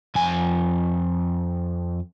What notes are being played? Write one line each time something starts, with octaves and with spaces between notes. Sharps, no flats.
F2 G#5